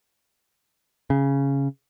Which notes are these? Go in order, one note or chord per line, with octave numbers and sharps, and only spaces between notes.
C#3